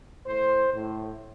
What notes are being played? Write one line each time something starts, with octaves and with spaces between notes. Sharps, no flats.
A2 C5
A2